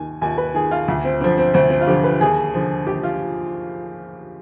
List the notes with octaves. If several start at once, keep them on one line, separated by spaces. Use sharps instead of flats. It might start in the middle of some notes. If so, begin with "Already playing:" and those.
Already playing: D#2 D#3 G#5
D#2 G#5
B4
D#3 G#4
F4
D2
C4
D3 F3 C4
C4
D2 C4
C4
F4
D3 F3 G4
B4
D#2 G#4
D3 F3
D#2 G4
F4